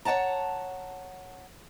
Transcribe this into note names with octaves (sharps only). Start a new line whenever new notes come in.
C#5 D5 F#5 A5 A#5